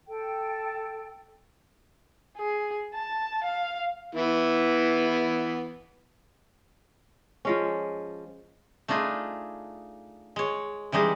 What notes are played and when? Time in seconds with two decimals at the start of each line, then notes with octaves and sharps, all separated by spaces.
0.08 A4 G5
2.38 G#4
2.94 A5
3.43 F5
4.15 E3 B3 E4
7.45 F3 G#3 C#4
8.88 A3 D4 D#4 F4 G#4
10.36 G#3 C#5
10.92 E3 G3 G#3 D#4 G#4